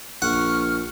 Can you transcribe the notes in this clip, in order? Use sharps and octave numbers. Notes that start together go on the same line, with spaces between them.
A#1 F#5 C#6 F6